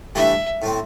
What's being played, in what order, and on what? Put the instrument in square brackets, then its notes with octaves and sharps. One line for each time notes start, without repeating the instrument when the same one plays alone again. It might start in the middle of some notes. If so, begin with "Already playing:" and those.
[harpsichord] G2 E3 A3 E4 G4 [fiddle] E5
[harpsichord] A2 A3 C4